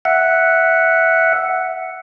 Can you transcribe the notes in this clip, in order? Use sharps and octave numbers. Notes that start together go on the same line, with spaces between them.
E5 F#5